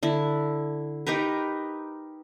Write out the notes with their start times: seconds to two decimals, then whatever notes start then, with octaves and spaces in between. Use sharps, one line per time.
0.03 D3 E4
1.07 D#4 G4 A#4 B4